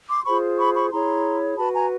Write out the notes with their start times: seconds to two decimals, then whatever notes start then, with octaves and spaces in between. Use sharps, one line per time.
0.09 C6 D6
0.25 F4 G#4 C5 B5 C#6
0.58 B5 C#6
0.74 B5 C#6
0.91 E4 G#4 C#5 A#5 C6
1.57 F#4 B4 A5 B5
1.74 G#5 A#5